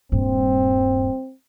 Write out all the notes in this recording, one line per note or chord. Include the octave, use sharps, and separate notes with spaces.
D#1 G2 C4